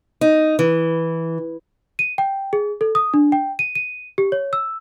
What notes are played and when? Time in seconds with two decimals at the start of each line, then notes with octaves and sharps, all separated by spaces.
0.21 D#4
0.59 E3
1.99 D#7
2.18 G5
2.53 G#4
2.81 A4
2.95 D#6
3.14 D4
3.32 G5
3.59 D#7
3.75 D#7
4.18 G4
4.32 C#5
4.53 E6